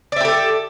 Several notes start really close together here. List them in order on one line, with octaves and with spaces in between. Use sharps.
D5 E5 G4 A4